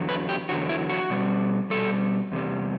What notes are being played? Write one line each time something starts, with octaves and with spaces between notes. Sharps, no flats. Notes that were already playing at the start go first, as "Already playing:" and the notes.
Already playing: E2 D3 F#3
B4
G4
E2 D3 F#3 F#4
E4
F#4
B2 G3
B2 G3 A4
E2 C3 G3